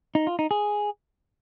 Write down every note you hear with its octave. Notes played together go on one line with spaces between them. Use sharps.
D#4
F4
D#4
G#4